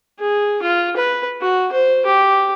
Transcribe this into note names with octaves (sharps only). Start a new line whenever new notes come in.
G#4
F4
B4
F#4
C5
G4